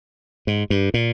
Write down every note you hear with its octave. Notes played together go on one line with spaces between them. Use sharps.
G#2
G2
A#2